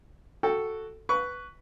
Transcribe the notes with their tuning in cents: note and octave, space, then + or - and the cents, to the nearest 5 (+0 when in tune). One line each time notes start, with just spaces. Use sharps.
F#4 +0 A4 +0 G5 +0
B4 +0 C#6 +25